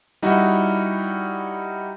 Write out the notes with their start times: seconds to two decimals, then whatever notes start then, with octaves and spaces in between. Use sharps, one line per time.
0.22 G3 D#4 E4 F#4